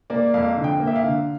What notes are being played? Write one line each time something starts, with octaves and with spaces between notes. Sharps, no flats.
A#3 D5
F2 F5
D3
G5
A#3
E5
F5
D3